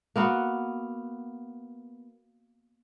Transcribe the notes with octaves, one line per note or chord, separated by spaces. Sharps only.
A#3 B3 F#4